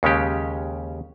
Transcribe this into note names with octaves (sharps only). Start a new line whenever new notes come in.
D#2 C#3 G#3 C#4 G4